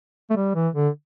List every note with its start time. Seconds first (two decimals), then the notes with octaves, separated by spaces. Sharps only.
0.30 A3
0.36 G3
0.55 E3
0.75 D3